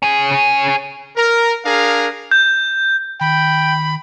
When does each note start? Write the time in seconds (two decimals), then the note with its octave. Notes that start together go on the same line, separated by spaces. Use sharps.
0.03 C#4 G#4
1.16 A#4
1.64 D4 G#4 A#4 F5
2.31 G6
3.21 D#3 G5 B5